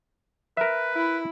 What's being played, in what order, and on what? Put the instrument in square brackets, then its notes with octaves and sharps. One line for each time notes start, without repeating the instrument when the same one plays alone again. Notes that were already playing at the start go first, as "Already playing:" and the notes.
[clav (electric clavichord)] A#4 E5 [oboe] B4
[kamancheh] E4